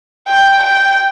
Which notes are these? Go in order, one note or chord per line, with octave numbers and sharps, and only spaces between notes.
G5
G5